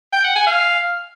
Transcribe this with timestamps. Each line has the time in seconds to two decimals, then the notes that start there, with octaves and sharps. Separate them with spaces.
0.13 G5
0.24 F#5
0.36 G#5
0.47 F5